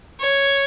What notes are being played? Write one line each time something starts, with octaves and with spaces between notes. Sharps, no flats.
C#5